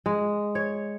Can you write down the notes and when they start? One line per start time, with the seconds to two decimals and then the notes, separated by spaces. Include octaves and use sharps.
0.06 G#3
0.55 C#5